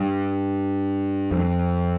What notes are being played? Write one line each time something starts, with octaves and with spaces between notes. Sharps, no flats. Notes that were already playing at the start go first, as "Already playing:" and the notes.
Already playing: G2
F2